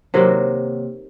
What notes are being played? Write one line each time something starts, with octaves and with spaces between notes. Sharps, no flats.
C3 D#3 F#3 A#3